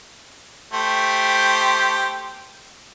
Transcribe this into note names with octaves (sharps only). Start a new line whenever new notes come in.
A3 G4 C5